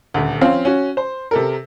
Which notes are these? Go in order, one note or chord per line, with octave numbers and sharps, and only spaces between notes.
D#1 D2
F3 C4 C#4 F5
C#4 F#4
C5
C3 A4 A#4